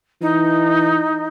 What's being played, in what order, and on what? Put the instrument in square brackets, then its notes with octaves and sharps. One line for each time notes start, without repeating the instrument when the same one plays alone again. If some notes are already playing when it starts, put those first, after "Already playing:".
[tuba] E3 [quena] D#4